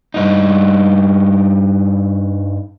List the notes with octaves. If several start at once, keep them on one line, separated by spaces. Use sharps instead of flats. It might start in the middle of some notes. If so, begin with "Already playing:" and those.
G2 D#4